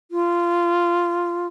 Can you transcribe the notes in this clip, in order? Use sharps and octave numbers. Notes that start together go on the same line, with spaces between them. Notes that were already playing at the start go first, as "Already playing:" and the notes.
F4